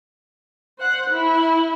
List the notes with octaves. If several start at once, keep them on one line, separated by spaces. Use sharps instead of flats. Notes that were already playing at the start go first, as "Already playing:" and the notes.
C5 F#5
E4